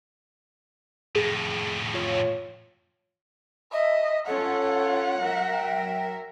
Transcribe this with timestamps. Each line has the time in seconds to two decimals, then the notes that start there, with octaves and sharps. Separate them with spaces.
1.16 F2 A2 G#4
1.94 F4 C#5
3.72 D#5 E5
4.27 C#4 F4 A4 C#5 F#5
5.19 F#3 A#4 E5
5.51 G5